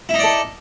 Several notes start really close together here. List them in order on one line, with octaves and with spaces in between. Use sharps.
E4 D#4 D5 A4